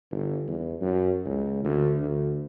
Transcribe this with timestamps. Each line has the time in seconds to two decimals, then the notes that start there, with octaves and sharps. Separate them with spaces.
0.11 G1
0.48 E2
0.81 F#2
1.25 C#2
1.64 D2
1.99 D2